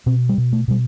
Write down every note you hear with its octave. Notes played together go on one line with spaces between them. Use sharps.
B2 C4
G3
B2
A3
B2 G3